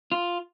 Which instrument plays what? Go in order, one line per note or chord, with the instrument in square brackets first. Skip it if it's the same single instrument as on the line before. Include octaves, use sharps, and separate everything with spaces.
[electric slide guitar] F4